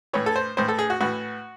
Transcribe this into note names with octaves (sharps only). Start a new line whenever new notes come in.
A2 E3 C#5
A4
C5
A2 E3 C5
A4
G#4
F#4
A2 E3 F#4